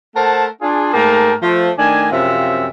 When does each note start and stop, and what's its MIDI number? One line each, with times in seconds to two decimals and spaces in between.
0.16 0.45 57
0.16 0.45 70
0.16 0.45 72
0.16 0.45 78
0.16 0.45 81
0.62 0.91 62
0.62 0.91 65
0.62 0.91 68
0.93 1.33 44
0.93 1.33 57
0.93 1.33 58
0.93 1.33 70
0.93 1.33 79
0.93 1.33 81
1.42 1.71 53
1.42 1.71 57
1.78 2.06 51
1.78 2.06 57
1.78 2.06 62
1.78 2.06 80
2.12 2.67 42
2.12 2.67 48
2.12 2.67 53
2.12 2.67 60
2.12 2.67 76
2.12 2.67 77